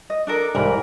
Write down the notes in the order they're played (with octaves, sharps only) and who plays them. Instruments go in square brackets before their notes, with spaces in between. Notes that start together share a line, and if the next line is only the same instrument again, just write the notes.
[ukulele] D#5
D4 A4 A#4
[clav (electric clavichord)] C2 G#2 E3 [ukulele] A#4 B5